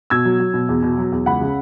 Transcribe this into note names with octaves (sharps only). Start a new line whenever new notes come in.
B2 E6 G#6
F#3
F#3
B2
E2
B2
F#3
E2
C#2 F#5 B5
C#3